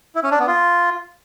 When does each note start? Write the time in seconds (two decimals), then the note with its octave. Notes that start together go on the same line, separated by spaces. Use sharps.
0.15 E4
0.23 C#4
0.31 D4
0.39 B3
0.47 F4